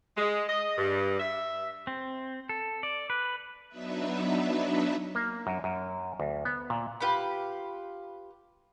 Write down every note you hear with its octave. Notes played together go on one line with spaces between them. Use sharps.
G#3
D#5
G2
E5
C4
A4
D5
B4
F#3 B3 D4 D#4 B4 E5
A#3
F#2
F#2
D2
B3
A#2
F4 G4 B4 B5